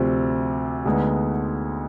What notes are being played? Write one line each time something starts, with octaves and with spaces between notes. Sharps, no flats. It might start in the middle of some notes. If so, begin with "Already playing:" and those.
Already playing: D2 C3 F3 C4
D2 D3 G#3 B3 D#4